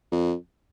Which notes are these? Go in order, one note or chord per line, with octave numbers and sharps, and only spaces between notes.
F2